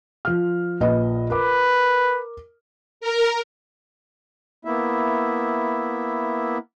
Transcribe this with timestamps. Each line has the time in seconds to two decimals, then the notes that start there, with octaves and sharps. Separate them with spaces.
0.25 F3 F6
0.80 A#1 B4 D#5
1.30 A#4 B4 D6
3.01 A#4
4.65 A#3 B3 E4 E5